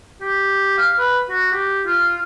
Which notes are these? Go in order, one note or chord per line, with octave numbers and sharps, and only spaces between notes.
G4
F5
B4
F#4
G4
F4